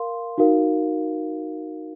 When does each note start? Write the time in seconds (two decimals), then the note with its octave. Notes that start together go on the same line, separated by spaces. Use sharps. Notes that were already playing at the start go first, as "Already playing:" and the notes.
Already playing: A#4 F5 C6
0.38 D#4 F#4 A#4 F5